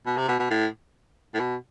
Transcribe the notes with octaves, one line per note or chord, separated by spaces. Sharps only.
B2
C3
B2
B2
A2
A2
B2